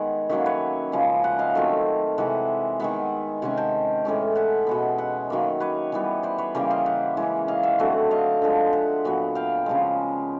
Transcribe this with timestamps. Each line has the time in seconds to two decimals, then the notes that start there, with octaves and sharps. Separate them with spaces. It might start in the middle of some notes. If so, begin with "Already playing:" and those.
Already playing: D#3 G#3 B3 F#5 G#5
0.29 D#3 F#3 A#3 C#4 E5 F#5
0.46 B4 C#5
0.92 C#3 F3 G#3
1.24 E5 F#5
1.39 D#5 F5
1.55 D#3 F#3 A3 C4
2.18 C3 E3 G#3 E5 F#5
2.80 D#3 G#3 B3 E5 F#5
3.42 C3 D#3 G#3 C#4 F#5 G#5
3.57 G5 A5
4.05 A2 E3 G#3 C#4
4.35 E5 F#5
4.67 B2 G#3 B3
4.98 E5 F#5
5.30 D#3 F#3 A#3
5.60 B4 C#5
5.92 E3 G3 B3
6.23 C5 D5
6.38 B4 C#5
6.55 C#3 E3 G3 A#3 A#4 C5
6.71 D#5 F5
6.86 E5 F#5
7.17 E3 G#3 C#4
7.48 D#5 F5
7.63 E5 F#5
7.79 D3 F#3 A3 C4
8.11 D#5 F5
8.42 D3 F3 G#3
8.73 E5 F#5
9.05 A#2 F#3 B3
9.35 F5 G5
9.66 C#3 F3 G#3